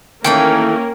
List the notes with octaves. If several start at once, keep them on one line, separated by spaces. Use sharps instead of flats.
D#3 E3 A3 A#3 C#4 A#4 G5